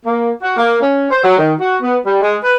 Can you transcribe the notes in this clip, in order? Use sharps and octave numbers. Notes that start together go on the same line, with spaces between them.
A#3
F#4
A#3
C#4
C5
F#3
D#3
F#4
B3
G3
G#3
B4